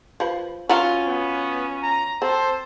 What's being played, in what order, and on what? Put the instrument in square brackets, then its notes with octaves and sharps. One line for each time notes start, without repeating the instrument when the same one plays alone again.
[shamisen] F3 B4
[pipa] F#3 F4 [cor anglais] C#4 [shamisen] B4 F#5
[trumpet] B3
A#5
[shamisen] C4 [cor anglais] A4 [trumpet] C5